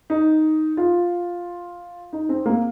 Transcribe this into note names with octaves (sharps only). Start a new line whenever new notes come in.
D#4
F4
D#4
C4
A#3